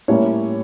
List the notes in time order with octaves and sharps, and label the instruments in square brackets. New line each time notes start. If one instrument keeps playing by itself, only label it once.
[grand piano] A2 G3 A#3 C#4 C#5